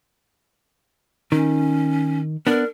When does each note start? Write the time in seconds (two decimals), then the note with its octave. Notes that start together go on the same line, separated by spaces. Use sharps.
1.32 D#3 C#4
2.47 B3 D4 A#4